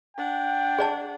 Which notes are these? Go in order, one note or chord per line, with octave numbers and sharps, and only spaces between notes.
D4 F#5 G5
G#4 D5 A5